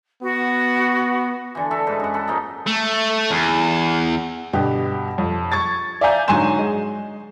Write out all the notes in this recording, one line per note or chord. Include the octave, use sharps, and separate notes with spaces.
B3 F#4
D3 E3
F#4 A4 E5
G#2 B4 A5
F#2 F#5
A4 F#5 A5 B5
G#2 F3 A#3 D#5
A3
E2
G2 B2 D3 G4
F2
C#6 G#6 A6
D5 E5 F5 G#5 A#5 G6
G#2 D3 F#3 G#5 C6 E7
G#3